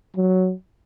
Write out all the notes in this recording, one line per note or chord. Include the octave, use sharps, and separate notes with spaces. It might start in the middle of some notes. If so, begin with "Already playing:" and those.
F#3